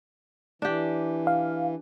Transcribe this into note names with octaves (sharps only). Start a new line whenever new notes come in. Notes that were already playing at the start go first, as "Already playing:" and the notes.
E3 D4 G4
F5